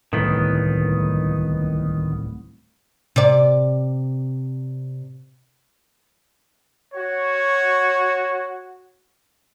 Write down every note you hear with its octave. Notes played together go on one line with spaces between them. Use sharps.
D1 C2 A2 D#3 B3
C3 D5
F#4 C#5